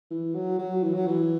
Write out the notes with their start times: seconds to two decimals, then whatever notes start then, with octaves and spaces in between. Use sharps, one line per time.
0.11 E3
0.34 F#3
0.59 F#3
0.83 E3
0.94 F#3
1.07 E3